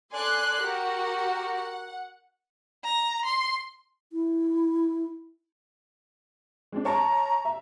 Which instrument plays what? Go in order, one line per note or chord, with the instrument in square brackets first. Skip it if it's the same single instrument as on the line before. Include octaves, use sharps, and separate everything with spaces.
[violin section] A4 D5 G#5 C6 F#6
F#4 G4 A#4 F#5
F#5
[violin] A#5
C6
[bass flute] E4
[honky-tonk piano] G#3 C4 D4
[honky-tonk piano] C#5 A5 C#6 [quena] A#5
[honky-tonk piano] E5